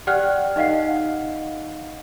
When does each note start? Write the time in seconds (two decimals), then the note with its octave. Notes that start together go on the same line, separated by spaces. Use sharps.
0.07 G4 D5 F#5 G5 F6 F#6
0.56 D#4 D#5 F5 F#5 C7